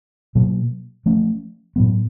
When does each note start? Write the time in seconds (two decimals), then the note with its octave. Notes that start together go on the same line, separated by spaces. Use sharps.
0.35 B2 F#3 A#3
1.06 F3 A3 C#4
1.76 A2 F#3 B3